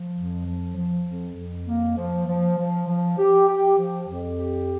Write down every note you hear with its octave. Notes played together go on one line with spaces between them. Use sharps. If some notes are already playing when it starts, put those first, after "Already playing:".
Already playing: F3
F2
F3
F3
F2
F2
A#3
F3
F3
F3
F3
G4
G4
F3
F2
G4